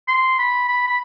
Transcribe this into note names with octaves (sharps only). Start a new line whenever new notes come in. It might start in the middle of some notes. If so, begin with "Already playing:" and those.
C6
B5
B5
B5